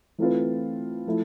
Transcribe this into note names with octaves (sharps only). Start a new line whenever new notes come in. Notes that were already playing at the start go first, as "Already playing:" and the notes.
E3 A3 C4 F4 B4
F3 A3 E4